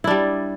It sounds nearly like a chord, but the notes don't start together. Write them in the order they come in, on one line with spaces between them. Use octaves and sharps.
E4 D4 G3